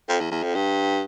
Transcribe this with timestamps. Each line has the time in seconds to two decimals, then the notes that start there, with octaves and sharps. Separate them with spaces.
0.09 F2
0.20 E2
0.31 E2
0.43 F2
0.55 G2